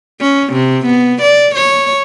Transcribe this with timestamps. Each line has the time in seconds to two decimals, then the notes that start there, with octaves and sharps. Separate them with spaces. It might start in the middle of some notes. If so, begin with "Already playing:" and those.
0.21 C#4
0.53 C3
0.86 B3
1.22 D5
1.55 C#5